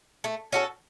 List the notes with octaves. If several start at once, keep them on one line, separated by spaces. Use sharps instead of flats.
A3
C#4 F#4 A4